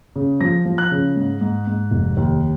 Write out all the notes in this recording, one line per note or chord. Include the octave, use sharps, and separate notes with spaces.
C#3
F3 A#6
F3
F#6
C#3
G#2
G#2
G#2
F1
D#2